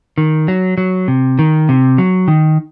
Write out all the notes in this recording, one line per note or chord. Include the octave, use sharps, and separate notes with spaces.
D#3
F#3
F#3
C3
D#3
C3
F#3
D#3